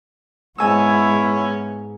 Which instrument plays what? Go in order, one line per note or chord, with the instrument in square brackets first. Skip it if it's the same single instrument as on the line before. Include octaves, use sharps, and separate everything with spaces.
[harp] G#2 G#5 E6 [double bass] G#3 B3 [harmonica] C#4 C#6 [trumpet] E4